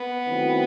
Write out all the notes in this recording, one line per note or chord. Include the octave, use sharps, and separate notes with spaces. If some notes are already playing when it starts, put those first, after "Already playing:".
Already playing: B3
D#3 F#3 A3 C4 E4